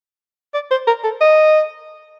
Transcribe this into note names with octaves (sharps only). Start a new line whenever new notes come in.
D5
C5
A#4
A4
D#5